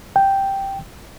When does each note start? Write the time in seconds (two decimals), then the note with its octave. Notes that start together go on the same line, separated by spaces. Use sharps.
0.16 G5